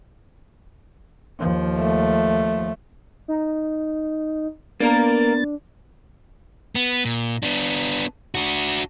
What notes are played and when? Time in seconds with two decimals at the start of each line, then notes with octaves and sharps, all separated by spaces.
1.39 D#2 F3
1.79 A3
3.28 D#4
4.80 A#3 B3 D4 A#4 A6
6.75 B3
7.05 A#2
7.43 B3 D4
8.35 D4 F#4